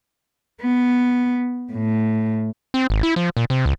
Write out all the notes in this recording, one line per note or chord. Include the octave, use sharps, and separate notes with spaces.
B3
A2
C4
G#1
E4
F3
A#2
C3
C#2